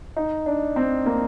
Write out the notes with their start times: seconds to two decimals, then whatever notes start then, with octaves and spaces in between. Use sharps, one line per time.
0.16 D#4
0.46 D4
0.76 C4
1.06 A#3